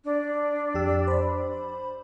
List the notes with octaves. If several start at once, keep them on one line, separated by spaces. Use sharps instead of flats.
D4
F2 G4 E6
C5 B5